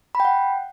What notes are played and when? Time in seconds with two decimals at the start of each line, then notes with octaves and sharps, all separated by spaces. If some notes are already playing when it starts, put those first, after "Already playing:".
0.15 B5
0.20 G5
0.25 F#5